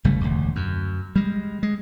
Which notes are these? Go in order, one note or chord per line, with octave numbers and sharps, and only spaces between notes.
G1 C#3 G3 A3
E1 D2
F#2
G3 G#3
G#3